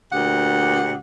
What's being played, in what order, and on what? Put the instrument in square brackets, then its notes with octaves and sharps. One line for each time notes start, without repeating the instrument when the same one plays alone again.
[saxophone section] D2 A#2 G4 F#5